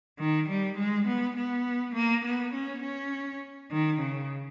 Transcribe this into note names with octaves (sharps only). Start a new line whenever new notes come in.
D#3
G3
G#3
B3
B3
A#3
B3
C#4
C#4
D#3
C#3